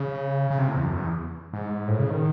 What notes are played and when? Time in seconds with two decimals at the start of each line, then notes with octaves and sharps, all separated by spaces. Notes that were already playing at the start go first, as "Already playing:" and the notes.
Already playing: C#3
0.50 C#3
0.59 C3
0.68 A2
0.76 E2
0.85 F#2
0.96 E2
1.53 G#2
1.88 A2
1.99 C#3
2.10 D#3